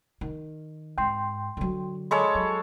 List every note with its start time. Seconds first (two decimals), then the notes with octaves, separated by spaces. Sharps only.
0.21 D#3
0.98 G#2 G5 C6
1.57 D3 F#3
2.11 G#3 A4 C#5 B5
2.35 F#3